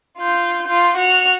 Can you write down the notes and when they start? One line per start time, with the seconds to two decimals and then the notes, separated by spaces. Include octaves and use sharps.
0.18 F4 G6
0.66 F4 G6
0.97 F#4 F7